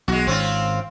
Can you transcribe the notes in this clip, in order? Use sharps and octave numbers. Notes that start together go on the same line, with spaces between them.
B1 G#3 F#4
G#1 C4 C#4 F4